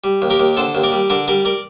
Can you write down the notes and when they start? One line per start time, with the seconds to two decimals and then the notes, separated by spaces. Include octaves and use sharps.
0.04 G3
0.22 D#2
0.30 G4 A#4
0.40 D#2
0.57 D3 A4 C5
0.75 D#2
0.83 A#4 D5
0.92 G3
1.10 D3 A#4 D5
1.28 G3 A#4 D5
1.45 A#4 D5